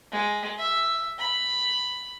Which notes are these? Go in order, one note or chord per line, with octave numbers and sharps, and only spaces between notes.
G#3
E5
B5